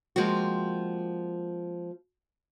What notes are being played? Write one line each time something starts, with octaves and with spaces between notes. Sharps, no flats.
F3 G#3 A#3 C4 F#4